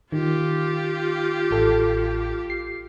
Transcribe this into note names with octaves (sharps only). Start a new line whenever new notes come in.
D#3 F4 G4
A1 A4
C7